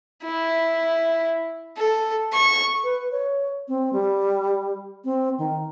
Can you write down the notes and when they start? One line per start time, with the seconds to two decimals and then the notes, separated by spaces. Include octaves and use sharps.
0.23 E4
1.77 A4
2.33 C#6
2.84 B4
3.12 C#5
3.68 C4
3.93 G3
5.04 C4
5.38 D#3